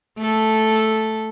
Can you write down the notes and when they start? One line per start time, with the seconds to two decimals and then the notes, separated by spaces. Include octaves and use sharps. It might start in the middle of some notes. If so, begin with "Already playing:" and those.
0.19 A3 A4